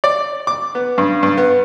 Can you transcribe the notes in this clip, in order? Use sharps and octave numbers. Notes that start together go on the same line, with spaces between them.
D5
D6
B3
G2
G2
B3